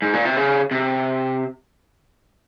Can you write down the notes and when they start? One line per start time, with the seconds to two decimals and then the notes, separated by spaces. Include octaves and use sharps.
0.02 G#2
0.13 A#2
0.25 C3
0.37 C#3
0.71 C3